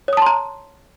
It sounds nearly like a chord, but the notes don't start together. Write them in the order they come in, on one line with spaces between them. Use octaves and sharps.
C#5 D#6 A5 C6 A#5